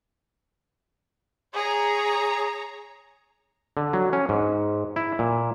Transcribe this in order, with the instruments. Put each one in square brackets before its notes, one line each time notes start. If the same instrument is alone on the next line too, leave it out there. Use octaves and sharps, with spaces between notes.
[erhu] G#4 [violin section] C#5 A#5
[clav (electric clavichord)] D3
F#3
C#4
G#2
E4
A#2